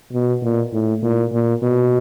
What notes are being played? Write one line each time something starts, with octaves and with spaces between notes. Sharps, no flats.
B2
A#2
A2
A#2
A#2
B2